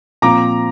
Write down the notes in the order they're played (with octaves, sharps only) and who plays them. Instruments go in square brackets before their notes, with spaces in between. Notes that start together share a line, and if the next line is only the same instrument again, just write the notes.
[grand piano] A#2 F3 C4 A#5 D6